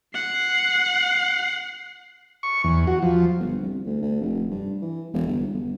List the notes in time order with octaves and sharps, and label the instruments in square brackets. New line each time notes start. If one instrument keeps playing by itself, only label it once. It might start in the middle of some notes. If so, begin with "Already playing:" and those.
[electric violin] F#5 C7
[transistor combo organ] C#6
E2
F#4
F3
[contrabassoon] G1
C2
D2
D2
F1
G2
E3
E1
G1
G1